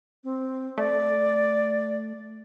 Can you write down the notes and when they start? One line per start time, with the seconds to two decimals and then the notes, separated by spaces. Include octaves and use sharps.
0.24 C4
0.78 A3 D5